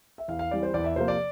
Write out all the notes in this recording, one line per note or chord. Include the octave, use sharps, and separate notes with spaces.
E5
E2 F5
F5
E3 G3 C4 D5
C5
E2 D5
E5
C3 F3 A#3 C5
D5